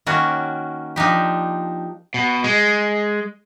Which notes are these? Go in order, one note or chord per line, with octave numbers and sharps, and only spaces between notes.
D#3 A#3 C#4 F#4
F3 D4 D#4 G4
B2
G#3